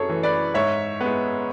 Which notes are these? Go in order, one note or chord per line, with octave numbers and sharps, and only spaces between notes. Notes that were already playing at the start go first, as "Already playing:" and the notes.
Already playing: F#2 G#4 A4 C#5
E3 A3
B4 D5
G#2 C#5 E5
B3
G#3